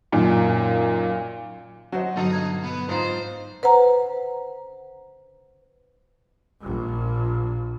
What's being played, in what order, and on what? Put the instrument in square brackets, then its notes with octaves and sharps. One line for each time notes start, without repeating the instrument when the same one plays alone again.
[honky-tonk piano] F#2 A#2 D#3
[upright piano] F#3 C5 D#5 [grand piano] F#4
[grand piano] G2 D3 [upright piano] B2 [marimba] F#3 [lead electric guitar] D#4
[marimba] G#6
[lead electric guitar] B3
[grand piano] G#2 [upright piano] D#4 F4 A#5 [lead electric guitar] C5
[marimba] B4 C5 F#5 A#5
[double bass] A#1 A#2